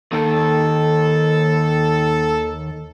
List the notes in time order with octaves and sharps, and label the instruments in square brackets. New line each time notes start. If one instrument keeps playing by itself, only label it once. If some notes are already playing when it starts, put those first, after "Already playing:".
[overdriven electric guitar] D#2 D#3 [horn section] A4